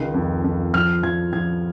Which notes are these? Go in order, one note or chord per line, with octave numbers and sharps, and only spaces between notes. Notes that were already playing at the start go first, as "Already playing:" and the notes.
Already playing: C#2 D#3
F2
F2
F3 F6
F3 G#6
F3 G#6